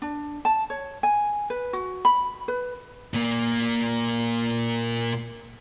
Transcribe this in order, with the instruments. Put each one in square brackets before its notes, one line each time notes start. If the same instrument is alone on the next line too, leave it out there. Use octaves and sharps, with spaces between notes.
[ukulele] D4
A5
C#5
G#5
B4
F#4
B5
B4
[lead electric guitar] A#2 A#3